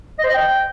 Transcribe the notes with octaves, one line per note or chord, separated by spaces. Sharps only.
D#5
C5
D#5
G5